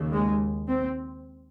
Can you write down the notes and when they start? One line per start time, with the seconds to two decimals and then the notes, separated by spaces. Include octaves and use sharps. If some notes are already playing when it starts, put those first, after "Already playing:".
Already playing: D#2 C#3
0.12 G#3
0.68 C4